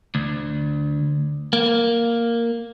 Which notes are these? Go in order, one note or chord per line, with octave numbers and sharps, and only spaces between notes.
D2
A#3